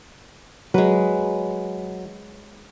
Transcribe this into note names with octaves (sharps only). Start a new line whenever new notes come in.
F#3 G#3 B4